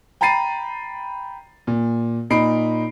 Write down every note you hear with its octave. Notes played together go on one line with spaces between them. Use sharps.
G5 A#5 B5 A6 C7 D#7
A#2
A#2 D#4 B5 C7 D7